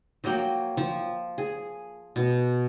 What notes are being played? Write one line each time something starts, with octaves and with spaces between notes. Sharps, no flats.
F3 F#3 A#3 G5
F3
G#4
B2